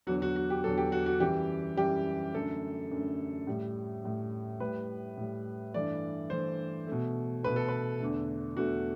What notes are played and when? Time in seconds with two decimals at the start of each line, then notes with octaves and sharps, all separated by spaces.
0.07 E2 D3 F#3 F#4
0.22 F#4
0.36 F#4
0.50 G4
0.64 E2 D3 F#3 A4
0.78 G4
0.92 F#4
1.06 F#4
1.20 F#2 E3 G3 G4
1.77 F#2 E3 G3 G4
2.35 F#2 D3 A3 A4
2.91 F#2 D3 A3
3.47 A2 G3
4.04 A2 G3
4.60 A2 G3 B4
5.17 A2 G3
5.74 G2 E3 A3 D5
6.30 G2 E3 A3 C5
6.87 B2 A3
7.43 B2 A3 B4
7.56 A4
7.68 B4
8.00 E2 D3 A3
8.57 E2 D3 A3 F#4